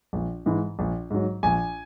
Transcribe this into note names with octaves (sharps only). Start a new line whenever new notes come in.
A#1
G#2 E3 G#3
A#1
G#2 F#3
A#1 G#5